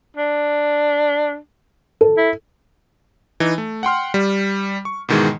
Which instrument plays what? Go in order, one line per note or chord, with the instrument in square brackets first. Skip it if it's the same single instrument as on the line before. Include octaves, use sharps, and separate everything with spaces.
[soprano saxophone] D4
[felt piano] A4
[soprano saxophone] E4
[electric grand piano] E3 D#4
A3
F#5 G5 C6 F6
G3
C#6
G#2 B2 D#3 E3 G#3